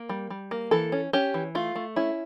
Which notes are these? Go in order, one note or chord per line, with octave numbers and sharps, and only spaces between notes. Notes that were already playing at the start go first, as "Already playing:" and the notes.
Already playing: A#3
G3
G3
A#3
E3 A4
C#4
C#4 G4
E3
A3 F4
A3
C#4 E4